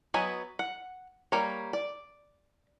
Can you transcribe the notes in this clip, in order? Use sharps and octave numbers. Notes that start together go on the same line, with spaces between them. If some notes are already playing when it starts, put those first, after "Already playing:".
F#3 B3 D#5 G#5 B5
F#5
G3 A#3 C#5
D5